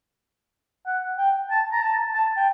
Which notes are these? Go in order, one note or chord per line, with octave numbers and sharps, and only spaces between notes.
F#5
G5
A5
A#5
A5
A5
G5